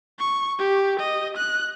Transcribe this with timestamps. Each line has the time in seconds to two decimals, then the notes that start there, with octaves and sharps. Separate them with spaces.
0.19 C#6
0.59 G4
0.99 D#5
1.37 F#6